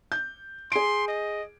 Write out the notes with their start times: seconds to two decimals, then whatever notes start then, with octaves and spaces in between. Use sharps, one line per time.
0.12 G6
0.72 G#4 C6 D7
1.08 D#5